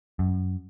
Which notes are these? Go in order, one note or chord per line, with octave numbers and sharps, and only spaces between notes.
F#2